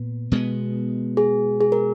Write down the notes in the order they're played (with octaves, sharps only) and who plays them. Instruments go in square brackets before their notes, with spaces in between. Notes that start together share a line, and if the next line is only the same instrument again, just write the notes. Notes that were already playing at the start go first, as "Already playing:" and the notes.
Already playing: [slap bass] A#2 B3
B2 G#3 B3
[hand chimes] G#4
G#4
A#4